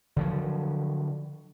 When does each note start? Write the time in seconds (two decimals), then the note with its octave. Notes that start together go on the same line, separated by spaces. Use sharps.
0.16 D3 F3 F#3